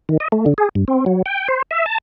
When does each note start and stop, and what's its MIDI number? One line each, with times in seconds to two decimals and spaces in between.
0.09 0.17 51
0.20 0.28 75
0.32 0.45 57
0.46 0.54 50
0.58 0.69 68
0.75 0.85 43
0.88 1.05 60
1.06 1.22 54
1.26 1.48 79
1.48 1.62 72
1.71 1.86 76
1.86 1.98 81